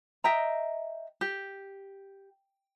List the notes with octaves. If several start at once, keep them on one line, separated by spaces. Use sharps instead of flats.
D#5 E5 G5 A#5
G4